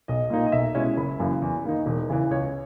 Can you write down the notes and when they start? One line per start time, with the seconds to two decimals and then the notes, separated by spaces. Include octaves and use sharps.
0.08 B1 D#5
0.30 A#2 A#3 D#4
0.46 D#5
0.52 B1 E5
0.75 B2 G#3 C#4 E4
0.97 F#1 B5
1.19 F#2 C#3 E3 A#3
1.42 E2
1.65 D#3 A#3 D#4
1.86 E1
2.09 E2 C#3 E3
2.31 C#2 C#5